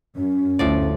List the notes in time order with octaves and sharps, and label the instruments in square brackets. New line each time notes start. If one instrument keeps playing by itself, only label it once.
[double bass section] F#2 [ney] C#4
[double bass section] G1 D2 [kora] A2 F3 D5